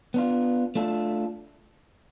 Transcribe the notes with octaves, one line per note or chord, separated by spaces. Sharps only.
B3 D4 F4
A3 D4 F4 A4